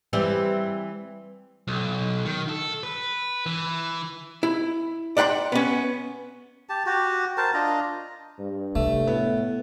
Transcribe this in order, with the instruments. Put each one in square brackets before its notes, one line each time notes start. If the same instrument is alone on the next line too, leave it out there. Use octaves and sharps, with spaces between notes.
[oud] E3 G3 C4
[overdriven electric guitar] B1
D#3
A4
B4
E3
[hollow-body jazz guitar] E4
D5 F#5 G5 B5 C6
B3 C#4
[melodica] G4 A5
F#4 G4
A#4 C5 A5
D4 F4 D#5 A#5
[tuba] G2
[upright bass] C3 [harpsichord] A3
[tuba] A2 [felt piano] B3